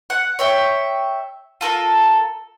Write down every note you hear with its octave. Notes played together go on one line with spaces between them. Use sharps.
F#5
C#5 E5 G5
F4 A4 A#4